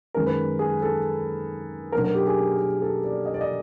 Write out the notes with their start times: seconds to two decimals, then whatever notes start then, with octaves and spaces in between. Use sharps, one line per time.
0.14 F#2 D#3 G#3 A#4
0.26 B4
0.59 G#4
0.82 A4
1.92 B2 F#3 A3 D4 A#4
2.04 A#4
2.14 G4
2.27 G#4
2.82 A4
3.04 D5
3.26 D#5
3.34 D5
3.41 D#5